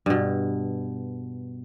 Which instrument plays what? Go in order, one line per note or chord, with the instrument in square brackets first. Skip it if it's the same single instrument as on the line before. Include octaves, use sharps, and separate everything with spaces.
[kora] G2 B2